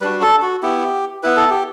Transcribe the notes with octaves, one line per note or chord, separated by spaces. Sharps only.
G3 D4 F#4 B4
A4
F#4
B3 E4 G4
B3 E4 B4
A4
G4